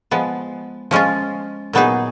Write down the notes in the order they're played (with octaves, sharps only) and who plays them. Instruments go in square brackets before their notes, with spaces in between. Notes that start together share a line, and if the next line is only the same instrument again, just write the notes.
[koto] F3 G#3 B3
F3 G#3 C#4 F4
A#2 F#3 B3 D#4 G#4